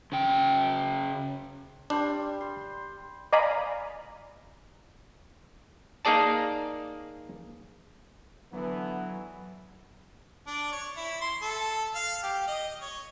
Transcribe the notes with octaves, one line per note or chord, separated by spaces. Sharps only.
C#3 G5
G3 D4 C5
C6
D5 D#5 F5 G#5 A#5 B5
A#3 D#4 G#4 D5 A5
D3 E3 F#3 B3
D4
C#5
E4
C6
A4
F5
G4
D#5
C#5